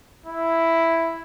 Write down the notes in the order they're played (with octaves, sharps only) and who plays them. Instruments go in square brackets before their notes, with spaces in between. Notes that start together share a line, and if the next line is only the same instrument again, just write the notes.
[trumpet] E4